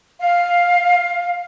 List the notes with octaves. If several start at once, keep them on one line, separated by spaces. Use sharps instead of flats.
F5